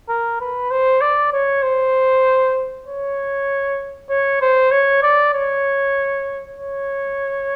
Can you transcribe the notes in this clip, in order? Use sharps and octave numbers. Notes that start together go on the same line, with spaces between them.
A#4
B4
C5
D5
C#5
C5
C#5
C#5
C5
C#5
D5
C#5
C#5